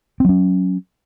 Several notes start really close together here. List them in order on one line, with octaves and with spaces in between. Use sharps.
C4 F#3 C#4